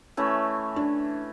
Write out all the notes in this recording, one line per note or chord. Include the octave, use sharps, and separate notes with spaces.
E3 A3 C#4
D4